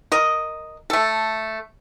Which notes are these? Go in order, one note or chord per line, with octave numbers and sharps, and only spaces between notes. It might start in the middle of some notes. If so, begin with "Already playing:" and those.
A#4 D#5
A3 A4